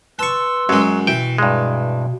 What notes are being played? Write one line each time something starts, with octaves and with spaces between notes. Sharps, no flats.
B4 A5 C6 C#6 E6
F#2 F#3 G#3
B2 E3 G5
G2 G#3